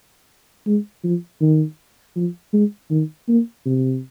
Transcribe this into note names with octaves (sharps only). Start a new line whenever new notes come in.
G#3
F3
D#3
F3
G#3
D#3
A#3
C3